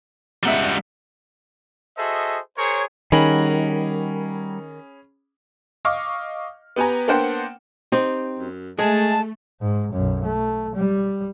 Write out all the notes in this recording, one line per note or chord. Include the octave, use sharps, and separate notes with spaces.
E1 C#2 G3 E5 F#5
F#4 G#4 A4 C5 D#5 E5
G#4 A#4 C5 C#5
D#3 G3 C#4 G#4 A#4 F#5 B5
D#5 F5 C#6 D6 F6
B3 G4 B4 G#5 A#5
A#3 B3 D4 C5 F#5 G5
C4 D#4 G4
F#2
G#3 A3 G#4 A5
G#2
B1 F#2
A3
G3